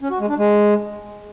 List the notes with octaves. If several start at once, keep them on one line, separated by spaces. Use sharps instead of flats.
C#4
F#4
G#3
D4
G#3